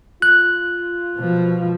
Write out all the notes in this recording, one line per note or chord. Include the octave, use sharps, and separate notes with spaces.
F4 F#6
B2 F3